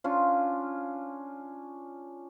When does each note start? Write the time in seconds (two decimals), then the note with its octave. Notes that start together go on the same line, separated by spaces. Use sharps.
0.04 C#4 D4 F4